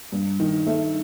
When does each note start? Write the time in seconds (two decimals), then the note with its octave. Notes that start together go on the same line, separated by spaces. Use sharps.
0.12 G2
0.40 D#3
0.67 A3